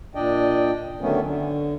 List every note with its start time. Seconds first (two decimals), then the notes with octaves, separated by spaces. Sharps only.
0.15 A#2 D4 D5 D#5 G5
1.01 D3 D#3 F#3 A3 B3 C#4
1.23 D3